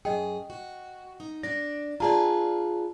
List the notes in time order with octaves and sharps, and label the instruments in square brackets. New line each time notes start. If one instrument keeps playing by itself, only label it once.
[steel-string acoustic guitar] F#2 G#4 [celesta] D#5 G5
[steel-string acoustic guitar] F#4
D#4
[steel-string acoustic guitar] D4 D5 [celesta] A#6
[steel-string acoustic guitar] F4 G#4 B4 [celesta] D5 A5 A#5